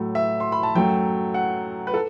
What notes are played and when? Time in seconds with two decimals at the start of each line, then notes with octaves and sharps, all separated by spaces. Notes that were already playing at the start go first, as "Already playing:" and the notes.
Already playing: A2 F#3 A3
0.15 E5
0.40 C6
0.52 B5
0.63 A5
0.75 F#2 F#3 A3 G5
1.34 F#5
1.87 B4
1.94 A4